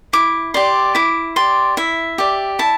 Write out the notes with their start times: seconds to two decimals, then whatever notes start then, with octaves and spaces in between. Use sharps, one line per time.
0.13 E4 D6
0.54 G4 D5 C6
0.95 E4 D6
1.36 G4 D5 C6
1.77 E4 E5
2.18 G4 D5
2.59 E4 A5